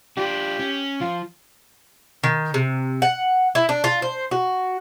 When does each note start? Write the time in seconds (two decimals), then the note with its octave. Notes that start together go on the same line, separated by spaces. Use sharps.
0.17 D4 F4 G4
0.59 C#4
1.01 F3 F4
2.24 D#3
2.54 C3
3.02 F#5
3.55 E4
3.69 D4
3.84 F4
4.02 C5
4.31 F#4